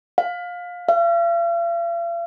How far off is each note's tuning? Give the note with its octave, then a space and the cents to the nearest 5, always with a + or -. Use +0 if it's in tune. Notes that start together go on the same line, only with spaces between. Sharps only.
F5 +20
F5 -45